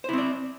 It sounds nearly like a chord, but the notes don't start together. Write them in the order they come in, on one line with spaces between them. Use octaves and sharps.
C5 E4 C4 D5